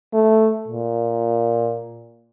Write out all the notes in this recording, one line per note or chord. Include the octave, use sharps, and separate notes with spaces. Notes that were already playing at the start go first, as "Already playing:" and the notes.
A3
A#2